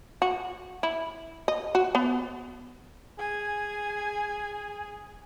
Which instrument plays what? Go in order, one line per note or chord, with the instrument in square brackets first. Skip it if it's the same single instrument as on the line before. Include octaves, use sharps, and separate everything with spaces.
[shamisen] F#4
E4
D#5
F#4
B3
[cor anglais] G#4 [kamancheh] G#5